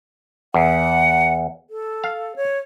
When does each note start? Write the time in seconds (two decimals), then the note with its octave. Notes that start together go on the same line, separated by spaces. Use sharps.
0.54 E2 F#5
1.70 A4
2.04 F5
2.36 C#5